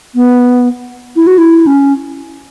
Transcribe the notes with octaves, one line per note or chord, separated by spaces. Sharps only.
B3
E4
F#4
E4
C#4